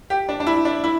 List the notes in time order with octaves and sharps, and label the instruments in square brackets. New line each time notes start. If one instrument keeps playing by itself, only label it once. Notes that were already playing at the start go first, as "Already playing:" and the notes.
[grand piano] G4
D4
D4
E4
D4
E4